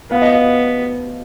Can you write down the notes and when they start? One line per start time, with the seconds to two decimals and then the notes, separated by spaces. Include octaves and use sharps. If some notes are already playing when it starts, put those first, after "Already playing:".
0.11 B3 F5
0.22 D#5
0.32 F5